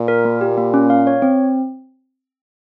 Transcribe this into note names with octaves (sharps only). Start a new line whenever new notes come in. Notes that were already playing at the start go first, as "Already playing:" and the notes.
Already playing: A#2
A#4
A#3
G4
A#3
C#4
F5
C#5
C4